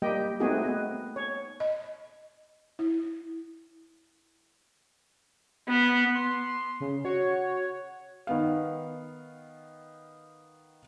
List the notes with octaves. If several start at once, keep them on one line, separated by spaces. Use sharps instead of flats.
G3 A#3 G4 D#5 G5
A3 B3 C4 D#4 F#4 G#4
B3 D#5
C#5
D#5
E4
B3
C6
C#3
F#4 C#5
D#3 B3 F5